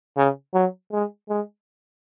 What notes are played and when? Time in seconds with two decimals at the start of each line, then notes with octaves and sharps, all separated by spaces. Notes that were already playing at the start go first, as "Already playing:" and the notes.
0.17 C#3
0.54 F#3
0.92 G#3
1.29 G#3